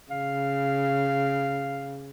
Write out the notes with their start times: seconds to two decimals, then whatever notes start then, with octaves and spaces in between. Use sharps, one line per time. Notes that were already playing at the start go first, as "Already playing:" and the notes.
0.11 C#3 F5